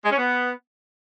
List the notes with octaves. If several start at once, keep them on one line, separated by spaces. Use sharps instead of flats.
G#3
C#4
B3